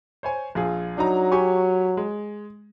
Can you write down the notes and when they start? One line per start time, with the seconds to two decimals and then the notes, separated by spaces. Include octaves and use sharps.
0.23 C5 C#5 G#5
0.55 A#1 F4 G#4
0.97 F#3 D4 D#4 A#5
1.32 G4 G#5 C#6
1.97 G#3